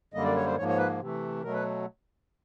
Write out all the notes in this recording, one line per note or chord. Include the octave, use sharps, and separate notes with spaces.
F#2 D3 G3 A#3 D#5
D5
C#5
C5
G#2 F3 A#3 C#5
C#5
B4
C3 E3 A3
B2 F#3 A3 A#4
B4